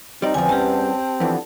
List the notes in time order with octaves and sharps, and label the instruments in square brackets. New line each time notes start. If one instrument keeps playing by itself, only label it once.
[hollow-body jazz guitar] G3 D5 [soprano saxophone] C4 [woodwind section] D#4
[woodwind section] E2 [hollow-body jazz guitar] D3 F3 [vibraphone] G#5
[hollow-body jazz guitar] G3 C#4 [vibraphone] G4 A5
[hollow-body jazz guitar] F2 E3 [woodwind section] D3 F3 B3